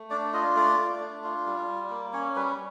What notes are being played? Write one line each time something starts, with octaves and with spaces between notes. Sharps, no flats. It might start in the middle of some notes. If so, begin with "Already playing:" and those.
Already playing: A3
D4 D5
F4 D#5
A3 D5
A3
D4
F4
G3
G3
A#3
C#4 C#5
G3 B4